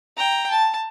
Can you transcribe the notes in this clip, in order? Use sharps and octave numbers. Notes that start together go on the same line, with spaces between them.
G5 A#5
A5